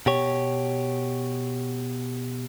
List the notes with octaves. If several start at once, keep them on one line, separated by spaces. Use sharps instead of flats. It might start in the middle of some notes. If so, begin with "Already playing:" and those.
B2 G4 C#5